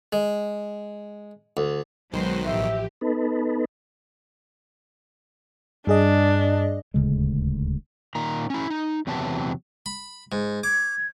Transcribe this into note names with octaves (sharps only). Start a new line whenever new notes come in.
G#3
D2
B1 B2 D#3 F#3 G#3 F#4 B4 C5
A1 F3 G4 E5
B3 D#4 A4 B4
G2 D4 G#4 D#5
D#1 D2 C#3 G#3
A#2 D#3 A#5
C#4 E4
D#4
E2 C3 E3 F#3 A5
B5
G#2
D6 G#6